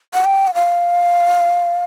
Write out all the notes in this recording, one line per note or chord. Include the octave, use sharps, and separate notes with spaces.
F#5
G5
F#5
F5